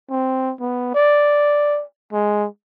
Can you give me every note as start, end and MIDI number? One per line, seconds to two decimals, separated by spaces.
0.11 0.54 60
0.61 0.94 59
0.95 1.83 74
2.13 2.47 56